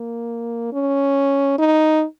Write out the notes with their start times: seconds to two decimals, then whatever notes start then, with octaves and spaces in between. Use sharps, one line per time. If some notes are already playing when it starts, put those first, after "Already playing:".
Already playing: A#3
0.73 C#4
1.59 D#4